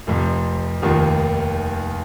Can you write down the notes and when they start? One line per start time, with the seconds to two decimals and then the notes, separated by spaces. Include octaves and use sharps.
0.07 F1 F2 C3
0.82 F1 D#2 D#3 A#3 F4